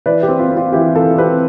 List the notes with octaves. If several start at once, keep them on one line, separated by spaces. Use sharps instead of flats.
E3 B4 D5
G4
C4
F4
C4
F4
E3 G4
E3 F4 A4
C4 G4 B4